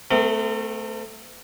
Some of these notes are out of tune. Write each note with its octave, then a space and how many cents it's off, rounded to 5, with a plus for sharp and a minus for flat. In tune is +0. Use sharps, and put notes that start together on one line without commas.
A3 +0 C4 -45 A#4 -45